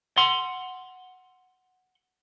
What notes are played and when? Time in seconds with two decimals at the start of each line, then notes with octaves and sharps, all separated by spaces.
0.17 F#5 C6